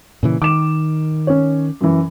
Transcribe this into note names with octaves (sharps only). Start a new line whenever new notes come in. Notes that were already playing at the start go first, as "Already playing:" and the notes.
A#2 C#3 E3
D#3 D6 E7
C#4 C#5
F#2 E3